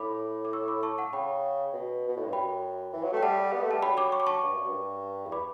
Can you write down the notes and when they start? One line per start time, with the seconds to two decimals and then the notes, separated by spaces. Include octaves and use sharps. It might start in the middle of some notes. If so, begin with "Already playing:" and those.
Already playing: A2 B5 D6
0.45 D6
0.53 C#6 E6
0.68 B5 D6
0.83 A5 C#6
0.98 F#5 A5
1.13 C#3 G5 B5
1.73 B2
2.08 B2
2.16 A2
2.24 G2
2.33 F#2 G5 B5
2.93 E3
3.03 F#3
3.13 A3
3.17 G5
3.23 G3 F#5 A5
3.53 B3
3.63 A3
3.71 G3 A5
3.83 F#3 G5 B5
3.97 B5 D6
4.12 C#6
4.20 D6
4.27 A5 C#6
4.43 G2
4.55 F#2
4.68 G2
5.26 E2
5.32 B5 D6